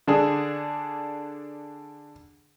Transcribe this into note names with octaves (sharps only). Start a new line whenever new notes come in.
D3 D4 G#4